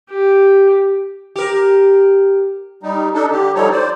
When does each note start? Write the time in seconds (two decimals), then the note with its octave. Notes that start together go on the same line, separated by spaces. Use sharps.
0.10 G4
1.36 G4 A#4
2.83 G3 D#4
3.14 D4 D#4 A4
3.31 D3 G4
3.55 F3 G3 D#4 A4 C#5
3.71 C5 D5